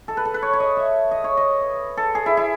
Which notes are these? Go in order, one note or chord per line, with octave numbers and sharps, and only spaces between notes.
A4
B4
A4
B4
C#5
C#5
D#5
E5
D#5
C#5
D#5
A4
G#4
E4
E4